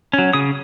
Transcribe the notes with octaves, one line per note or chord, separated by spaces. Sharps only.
C#4
F#3
C#3 D#6